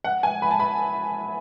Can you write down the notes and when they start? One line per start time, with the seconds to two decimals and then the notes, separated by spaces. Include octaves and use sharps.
0.04 F#5
0.23 G#5
0.42 B5
0.51 A5
0.60 B5